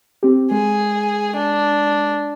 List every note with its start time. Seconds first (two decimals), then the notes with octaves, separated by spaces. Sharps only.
0.23 C4 G4
0.51 G#3 G#4
1.36 D4